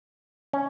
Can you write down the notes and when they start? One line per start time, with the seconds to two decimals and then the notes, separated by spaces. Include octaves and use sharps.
0.53 C#4